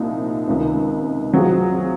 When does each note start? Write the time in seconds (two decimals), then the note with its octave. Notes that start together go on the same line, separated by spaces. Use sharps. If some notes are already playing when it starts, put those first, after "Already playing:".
Already playing: C2 A#2 F3 D#4
0.47 C#2 C3 D#3
1.33 C3 F#3 C4 F4 G#4